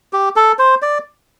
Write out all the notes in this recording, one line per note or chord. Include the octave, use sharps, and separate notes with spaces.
G4
A4
C5
D5